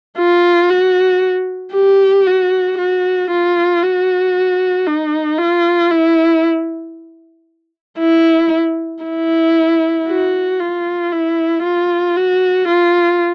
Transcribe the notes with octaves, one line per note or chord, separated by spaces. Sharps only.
F4
F#4
G4
F#4
F#4
F4
F#4
D#4
F4
E4
E4
E4
F#4
F4
E4
F4
F#4
F4